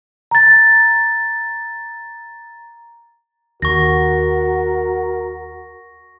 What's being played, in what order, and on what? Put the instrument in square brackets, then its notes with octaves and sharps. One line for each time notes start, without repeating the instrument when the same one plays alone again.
[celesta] A#5 A6
[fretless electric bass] D#2 [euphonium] F#4 [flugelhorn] A#4 [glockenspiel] C#6 A#6